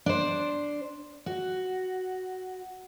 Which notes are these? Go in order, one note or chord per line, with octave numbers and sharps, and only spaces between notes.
D4 C5
F#4